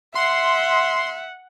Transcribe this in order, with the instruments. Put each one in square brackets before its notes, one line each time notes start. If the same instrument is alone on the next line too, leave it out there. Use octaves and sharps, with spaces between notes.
[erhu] E5 [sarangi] F#5 [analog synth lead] C6